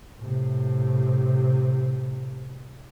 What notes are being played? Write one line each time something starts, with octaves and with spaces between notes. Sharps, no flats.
A2 C3